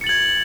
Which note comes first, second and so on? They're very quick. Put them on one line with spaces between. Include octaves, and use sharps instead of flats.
C#7 A6 F#7 G#6